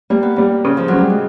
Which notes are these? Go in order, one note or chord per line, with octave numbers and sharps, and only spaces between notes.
G3 A#3
B3
G3 A#3
C#3
F3
C#3 F#3
G3
G#3